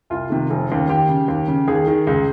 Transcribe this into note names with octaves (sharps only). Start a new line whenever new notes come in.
C2 F4
C3 D#3
F1
D#2 C#3
D#2 G4
C#3
D#2
C#3
D#2 G#4
D#3
C#2